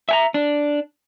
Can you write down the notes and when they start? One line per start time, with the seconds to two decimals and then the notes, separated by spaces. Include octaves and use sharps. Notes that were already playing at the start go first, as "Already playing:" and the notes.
0.09 E5 G#5 A#5
0.34 D4